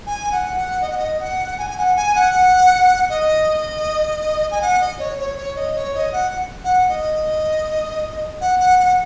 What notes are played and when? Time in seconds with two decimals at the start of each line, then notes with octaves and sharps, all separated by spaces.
0.06 G#5
0.32 F#5
0.57 F#5
0.82 D#5
0.90 F#5
0.98 D#5
1.20 F#5
1.58 G#5
1.70 G#5
1.78 F#5
1.96 G#5
2.15 F#5
3.10 D#5
4.51 G#5
4.62 F#5
4.81 D#5
4.99 C#5
5.19 C#5
5.37 C#5
5.56 D#5
5.75 C#5
5.95 D#5
6.13 F#5
6.64 F#5
6.89 D#5
8.41 F#5
8.60 F#5
8.80 F#5